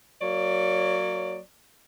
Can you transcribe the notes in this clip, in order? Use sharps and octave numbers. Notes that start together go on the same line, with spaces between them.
F#3 A#3 C#5 D5